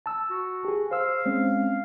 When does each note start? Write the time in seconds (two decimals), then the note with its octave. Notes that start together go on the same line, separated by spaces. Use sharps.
0.06 A5 E6
0.30 F#4
0.65 G4 G#4
0.91 C5 F5 E6
1.26 G#3 C4 C#4